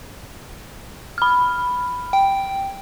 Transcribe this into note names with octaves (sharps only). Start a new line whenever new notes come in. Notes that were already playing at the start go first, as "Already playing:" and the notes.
B5 F6
G5